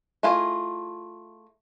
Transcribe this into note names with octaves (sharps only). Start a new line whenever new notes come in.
A3 E4 F4 G#4 D#5